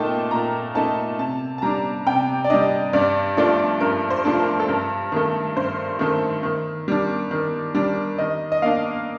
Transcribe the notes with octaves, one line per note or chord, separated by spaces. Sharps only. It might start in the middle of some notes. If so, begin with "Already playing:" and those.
Already playing: A#2 A3 D#4 G5 A5
A#2 A#5
A3 D#4 A5
C3 A5
A5
G3 D4 A#5
C3 G5
D5
G3 D4 D#5
G2 D5
F3 A3 D4 D5
G2 A#4
C5
F3 A3 D4
A#4
A4
G2 A#4
D#3 A3
G2 C5
D#3 A3
D#3
G3 D4
D#3
G3 D4
D#3 D#5
D#5
A#3 D4 F5